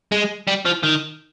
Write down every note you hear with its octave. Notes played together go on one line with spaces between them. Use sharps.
G#3
G3
F3
D#3